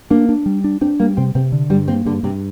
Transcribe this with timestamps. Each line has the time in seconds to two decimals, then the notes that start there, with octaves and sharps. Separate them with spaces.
0.10 A#3 D4
0.29 D4
0.46 G3
0.64 D4
0.81 C4 D4
0.99 G3 A#3
1.17 C3 C4
1.35 C3 C4
1.52 D3
1.70 G2 G3
1.88 A#3 C4
2.05 G2 D3
2.23 G2 C3